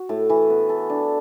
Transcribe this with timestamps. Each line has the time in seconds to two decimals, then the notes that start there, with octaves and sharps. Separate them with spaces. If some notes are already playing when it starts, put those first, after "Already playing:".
Already playing: F#4
0.09 A2
0.30 E3
0.50 B3
0.69 A4
0.90 D4